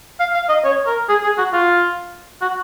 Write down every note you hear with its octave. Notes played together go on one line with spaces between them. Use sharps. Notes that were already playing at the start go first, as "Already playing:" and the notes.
F5
F5
D#5
C#5
A#4
G#4
G#4
F#4
F4
F#4